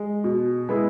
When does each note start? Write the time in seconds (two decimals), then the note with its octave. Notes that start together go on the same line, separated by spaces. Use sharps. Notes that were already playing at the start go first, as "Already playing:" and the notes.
Already playing: G#3
0.24 B2
0.69 G#3 B3 E4 G#4